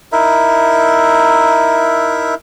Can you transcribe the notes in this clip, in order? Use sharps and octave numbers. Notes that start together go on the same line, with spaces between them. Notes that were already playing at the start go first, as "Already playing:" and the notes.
D#4 E4 A#4 E5